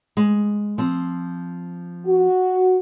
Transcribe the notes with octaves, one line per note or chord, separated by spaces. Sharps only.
G#3
F3 C4
F#4